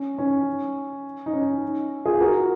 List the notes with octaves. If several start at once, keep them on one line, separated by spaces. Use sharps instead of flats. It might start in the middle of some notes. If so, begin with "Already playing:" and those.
Already playing: C#4
C#4
D#4
C#4
F4 G#4
F#4 A#4